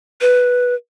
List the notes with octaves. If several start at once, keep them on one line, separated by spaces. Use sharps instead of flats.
B4